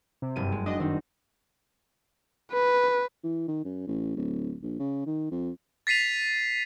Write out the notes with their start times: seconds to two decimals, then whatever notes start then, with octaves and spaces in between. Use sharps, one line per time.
0.22 C3
0.36 F#1 G2 D#7
0.52 G#3
0.66 D4 F#4 D#5
0.80 D#3 C4 D#4
2.53 B4
3.23 E3
3.48 D#3
3.65 F#2
3.87 A1
4.16 D1
4.63 A#1
4.79 C#3
5.06 D#3
5.31 F2
5.87 A6 B6 C7 D#7 F7